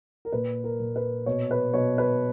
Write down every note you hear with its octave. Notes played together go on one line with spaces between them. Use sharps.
A#4
A#2 B4
A#4
A#2
B4
B2 C#5
B4
B2 C#5
B4